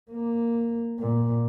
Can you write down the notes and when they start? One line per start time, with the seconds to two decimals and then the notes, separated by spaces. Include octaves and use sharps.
0.11 A#3
1.00 A#2